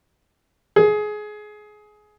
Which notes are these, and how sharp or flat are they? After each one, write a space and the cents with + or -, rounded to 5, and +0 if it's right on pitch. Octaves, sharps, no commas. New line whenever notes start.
G#4 +20